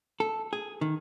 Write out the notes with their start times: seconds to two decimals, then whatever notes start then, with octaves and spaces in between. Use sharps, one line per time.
0.20 A4
0.53 G#4
0.81 D#3